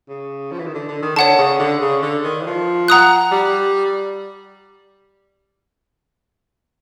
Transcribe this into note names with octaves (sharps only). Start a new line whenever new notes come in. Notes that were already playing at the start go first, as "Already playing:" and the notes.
C#3
F3
E3
D#3
D3
D3
D#3
D3 C#5 F#5 A5
C#3
D3
C#3
D3
D#3
E3
F3
F#5 A#5 D#6 F#6
G3